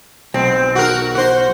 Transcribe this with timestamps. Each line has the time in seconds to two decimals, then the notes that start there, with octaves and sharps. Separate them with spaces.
0.34 B1 C4
0.75 F#4 A#4
1.15 F#4 C5